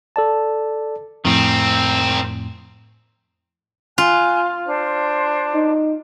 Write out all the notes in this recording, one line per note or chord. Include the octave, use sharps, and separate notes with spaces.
A4 D5 A5
F2 A2 D#3 C4
F4 G#5 F#6
D4 C5
D#4